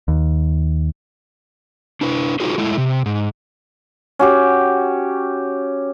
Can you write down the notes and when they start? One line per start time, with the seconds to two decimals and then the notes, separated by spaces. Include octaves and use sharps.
0.08 D#2
2.01 D4 E4 B4
2.40 D#4 F4 F#4 G#4 A#4 C5
2.58 G#3 A3 E4
2.78 C3
3.06 G#2
4.19 C#4 F#4 G4